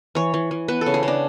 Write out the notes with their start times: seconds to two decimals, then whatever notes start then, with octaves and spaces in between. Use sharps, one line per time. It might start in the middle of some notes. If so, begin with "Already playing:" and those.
0.15 E3 C#5
0.34 E3
0.51 E3
0.68 B3 B4
0.81 A4
0.86 C#3
0.94 G#4
1.03 C#3
1.08 D4